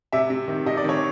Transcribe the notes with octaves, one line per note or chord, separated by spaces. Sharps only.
C3 E5
C3
D#3
C3 D#5
D5
D#3 C#5